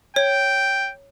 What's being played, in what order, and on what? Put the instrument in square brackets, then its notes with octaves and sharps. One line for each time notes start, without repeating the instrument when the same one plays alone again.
[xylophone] C#5 [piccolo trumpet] G5